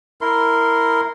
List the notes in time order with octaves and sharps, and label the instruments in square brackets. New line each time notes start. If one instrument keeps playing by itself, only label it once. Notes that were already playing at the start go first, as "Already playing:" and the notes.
[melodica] E4 A#4 C6